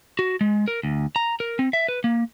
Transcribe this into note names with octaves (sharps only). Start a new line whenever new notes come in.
F#4
G#3
A#4
D2
A#5
A#4
C4
E5
B4
A#3